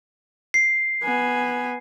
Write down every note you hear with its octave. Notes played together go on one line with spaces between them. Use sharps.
C7
B3 G#5